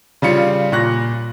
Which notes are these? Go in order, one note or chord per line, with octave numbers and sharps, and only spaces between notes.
C#3 G3 F4 C#7
A#2 C#6 F#6 A#6